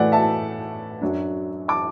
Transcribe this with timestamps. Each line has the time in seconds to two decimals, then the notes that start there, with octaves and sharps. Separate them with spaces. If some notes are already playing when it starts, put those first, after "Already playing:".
Already playing: A2 E3 A3 D5 F#5
0.12 E5 A5
1.01 F#2 F#3 D4
1.68 A5 D6